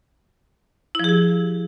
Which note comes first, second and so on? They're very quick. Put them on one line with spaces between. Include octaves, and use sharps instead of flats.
E4 F3 G#4 G4